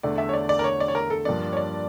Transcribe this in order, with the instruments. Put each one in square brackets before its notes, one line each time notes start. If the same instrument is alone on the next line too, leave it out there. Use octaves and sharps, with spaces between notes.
[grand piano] E2 D3 A3 [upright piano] D5
[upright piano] E5
C#5
D5
D5
A#4
C#5
D5
C#5
A#4
A4
[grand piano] G2 F3 A#3 D4 [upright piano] D5
[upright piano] C#5
D5